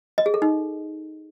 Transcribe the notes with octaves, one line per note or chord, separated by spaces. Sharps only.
D#5
G#4
A4
D#4